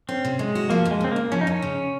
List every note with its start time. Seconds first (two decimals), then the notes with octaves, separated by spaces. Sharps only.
0.09 C4 C#4
0.25 C3
0.39 F#3 G#3
0.55 F#4
0.70 F3 A#3
0.85 F2
0.91 G#3
1.01 C#3 C4
1.11 F2 A#3
1.32 F3 C#4
1.41 D#4
1.47 F2 C#4
1.62 C#3